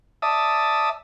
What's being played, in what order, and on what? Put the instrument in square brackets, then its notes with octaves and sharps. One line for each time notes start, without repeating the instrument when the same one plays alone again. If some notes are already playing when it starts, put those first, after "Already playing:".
[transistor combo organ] D5 E5 A5 D#6